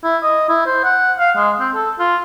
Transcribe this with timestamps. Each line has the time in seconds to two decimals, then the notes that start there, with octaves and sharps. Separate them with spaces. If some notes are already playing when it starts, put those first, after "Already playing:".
0.04 E4
0.23 D#5
0.49 E4
0.66 C5
0.84 F#5
1.19 F5
1.36 G#3
1.60 C4
1.74 A4
1.99 F4